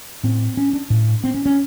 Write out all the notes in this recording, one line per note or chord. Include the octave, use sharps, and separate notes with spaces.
A2 C4
C#4
D4
A2
C4
C#4
C#4